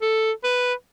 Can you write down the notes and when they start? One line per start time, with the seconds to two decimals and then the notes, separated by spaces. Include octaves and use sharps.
0.01 A4
0.44 B4